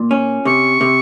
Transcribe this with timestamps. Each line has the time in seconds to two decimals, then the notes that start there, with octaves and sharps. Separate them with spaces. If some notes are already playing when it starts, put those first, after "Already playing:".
Already playing: A#2
0.11 C#4
0.45 C3 C#6
0.81 C3